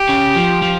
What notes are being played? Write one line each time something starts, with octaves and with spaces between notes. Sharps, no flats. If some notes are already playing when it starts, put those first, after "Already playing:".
Already playing: G4
C#3
F3
F3